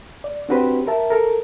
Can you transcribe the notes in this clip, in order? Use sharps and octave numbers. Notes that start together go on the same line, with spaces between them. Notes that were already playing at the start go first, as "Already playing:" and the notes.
D5
C4 D4 F#4 G4 B4 C5
A#4 E5 A5
A4 A#4